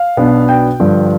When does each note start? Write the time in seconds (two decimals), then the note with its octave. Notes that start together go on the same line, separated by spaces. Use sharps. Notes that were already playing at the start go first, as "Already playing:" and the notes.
Already playing: F5
0.17 B1 B2 B3 D4
0.49 G5
0.80 G2 D3 F3